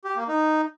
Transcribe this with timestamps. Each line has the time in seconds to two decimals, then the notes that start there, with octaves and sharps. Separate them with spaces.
0.05 G4
0.16 A#3
0.28 D#4